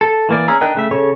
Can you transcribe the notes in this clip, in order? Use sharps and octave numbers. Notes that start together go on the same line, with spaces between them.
A4
E3 A#3 D5
C#4 G#4 A#5 E6 F6
D4 D#4 A#4 G5 F#6
C#3 A3 E5
C#3 A4 C#5 C#6